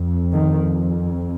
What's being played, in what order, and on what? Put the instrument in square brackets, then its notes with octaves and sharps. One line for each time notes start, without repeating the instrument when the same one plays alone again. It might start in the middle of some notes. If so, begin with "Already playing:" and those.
Already playing: [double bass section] F2
D#3